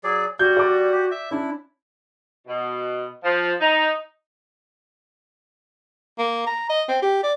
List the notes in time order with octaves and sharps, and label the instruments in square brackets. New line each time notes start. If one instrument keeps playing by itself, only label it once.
[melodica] F#3 G#4 D5
[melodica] G3 [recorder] F#4 [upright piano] G6
[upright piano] D5 D6
[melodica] G4
E5
[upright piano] C#4 D4 [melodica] E4
[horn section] B2
F3
D#4
[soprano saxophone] A#3
A#5
D#5
C4
G4
D5